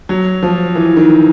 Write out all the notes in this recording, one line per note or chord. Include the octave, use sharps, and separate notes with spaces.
F#3
F3
E3
D#3